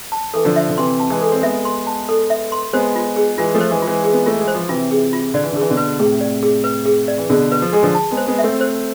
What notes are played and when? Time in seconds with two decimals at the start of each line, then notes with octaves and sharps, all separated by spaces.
0.12 A5
0.34 E3 A4
0.45 D3 F3
0.56 E5
0.69 D3
0.78 C3 E3 C6
1.00 A5
1.10 E3 G#3
1.22 A4
1.32 C4
1.43 G#3 B3 E5
1.65 C6
1.87 A5
2.09 A4
2.30 E5
2.52 C6
2.73 G#3 B3 C5
2.96 F4
3.16 G#4
3.38 E3 G#3 F4
3.54 F3 A3
3.60 C5
3.71 E3 G#3
3.82 F4
3.87 E3 G#3
4.04 G#4
4.13 B3
4.26 A3 F4
4.41 G#3
4.48 C5
4.55 F3
4.69 C3 E3 F4
4.91 G#4
5.13 F4
5.34 D3 D5
5.44 E3
5.52 D3 G#4
5.61 E3
5.70 B2 D3
5.77 B4
5.99 A2 C3 G#4
6.21 D5
6.43 G#4
6.64 B4
6.86 G#4
7.08 D5
7.18 E3
7.29 B2 D3 G#4
7.52 B4
7.62 F3
7.72 G#3 G#4
7.83 D3 F3
7.95 A5
8.11 G#3 B3
8.17 C5
8.27 G#3 B3
8.39 E5
8.44 A3 C4
8.61 C5